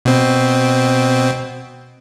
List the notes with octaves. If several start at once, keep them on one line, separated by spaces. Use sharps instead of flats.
B2 C4